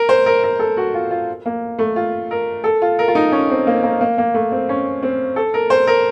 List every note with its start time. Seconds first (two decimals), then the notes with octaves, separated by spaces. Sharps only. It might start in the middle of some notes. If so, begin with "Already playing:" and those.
Already playing: A#4
0.09 C5
0.26 A#4
0.44 A#4
0.59 A4
0.77 F#4
0.94 F4
1.11 F4
1.46 A#3
1.79 A3
1.96 F4
2.31 A#4
2.64 A4
2.82 F4
2.99 A#4
3.08 F4
3.15 D#4
3.32 C#4
3.50 C4
3.67 A#3
3.83 A#3
4.01 A#3
4.18 A#3
4.34 A3
4.52 C4
4.69 C#4
5.03 C4
5.36 A4
5.54 A#4
5.70 C5
5.87 A#4